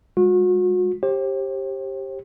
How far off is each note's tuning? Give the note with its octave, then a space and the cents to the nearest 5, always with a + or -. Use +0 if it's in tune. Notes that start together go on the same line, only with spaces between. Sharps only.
G#3 -35 F#4 -35
G4 +0 C5 +40